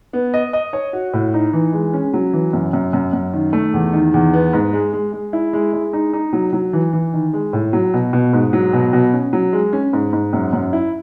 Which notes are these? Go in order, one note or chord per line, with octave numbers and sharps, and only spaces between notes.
B3
D#5
D#5
C#5
F#4
A2
D#4
E3
G#3
C#4
F#3
E3
F#2
F#2
F#2
F#2
D#3
A3
E2
D#3
E2
B3
G#2
G#3
G#3
G#3
E4
G#3
G#3
D#4
D#4
F#3
F#3
E3
E3
D#3
G#3
A2
F#3
B2
B2
G#2
F#3
B2
B2
C#4
F#3
G#3
C#4
G#2
G#2
F#2
F#2
E4